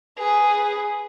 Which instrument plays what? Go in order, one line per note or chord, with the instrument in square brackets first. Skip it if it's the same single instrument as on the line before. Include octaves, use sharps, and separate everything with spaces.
[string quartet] G#4 B4